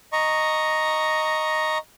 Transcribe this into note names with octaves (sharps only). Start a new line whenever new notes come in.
D#5 A#5 C#6